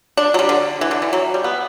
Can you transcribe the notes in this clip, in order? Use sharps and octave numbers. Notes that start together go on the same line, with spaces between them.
D4
F#3
G3
D3
E3
D3
E3
F#3
G3
B3